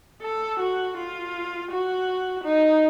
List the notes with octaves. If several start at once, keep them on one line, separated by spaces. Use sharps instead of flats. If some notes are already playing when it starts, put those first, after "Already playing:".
A4
F#4
F4
F#4
D#4